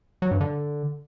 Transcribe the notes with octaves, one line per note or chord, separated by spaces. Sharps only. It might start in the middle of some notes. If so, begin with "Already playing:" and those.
F#3
G2
D3